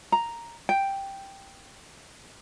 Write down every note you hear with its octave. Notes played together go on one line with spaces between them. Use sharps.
A#5
G5